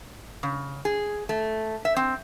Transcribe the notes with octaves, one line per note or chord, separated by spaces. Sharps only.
C#3
G#4
A3
E5
C4